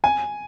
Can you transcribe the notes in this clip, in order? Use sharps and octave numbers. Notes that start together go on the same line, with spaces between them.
G#5